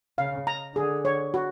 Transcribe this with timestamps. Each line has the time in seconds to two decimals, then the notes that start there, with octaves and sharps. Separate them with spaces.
0.18 C#3 F5
0.47 A#5
0.75 D3 G#4
1.05 C#5
1.34 F#4